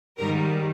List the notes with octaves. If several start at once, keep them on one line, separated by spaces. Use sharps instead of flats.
G#2 D#3 G3 A#4